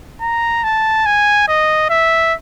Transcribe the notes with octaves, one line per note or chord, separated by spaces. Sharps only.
A#5
A5
G#5
D#5
E5